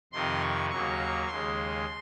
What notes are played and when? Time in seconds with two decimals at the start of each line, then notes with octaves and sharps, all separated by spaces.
0.12 F2 C3 D#3 C6
0.42 C#6
0.70 D#2 C#3 F#3 A#3 C#6
1.28 D#2 C#3 G#3 C6